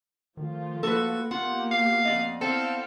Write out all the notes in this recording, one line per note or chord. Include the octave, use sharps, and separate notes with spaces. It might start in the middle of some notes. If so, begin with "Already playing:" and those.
D#3 F3 A3 F4
A#3 F#4 A4 B4
A#3 B3 F4 G4 F#5
F5
F2 D5 D#5
C4 E4 A4 F5 G5